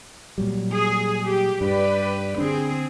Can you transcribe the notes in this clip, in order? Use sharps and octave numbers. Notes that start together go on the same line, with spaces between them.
A#2 F#3 G3
G#4
G4
G2 G4 B4 D5
D3 C4 D4 G#4